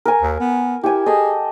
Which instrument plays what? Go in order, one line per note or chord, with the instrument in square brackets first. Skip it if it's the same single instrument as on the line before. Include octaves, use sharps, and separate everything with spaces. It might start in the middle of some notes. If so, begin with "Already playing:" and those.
[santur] A#4 G#5
[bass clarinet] D#2
B3
[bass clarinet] E4 [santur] G4 G#5
[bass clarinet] G#4 [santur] A4 D#5